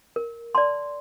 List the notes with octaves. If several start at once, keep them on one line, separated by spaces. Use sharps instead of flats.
A#4
D5 A5 C6